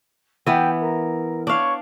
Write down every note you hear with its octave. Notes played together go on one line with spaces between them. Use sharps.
E3 B3 G5
A#4
D4 C#5 F5 C#6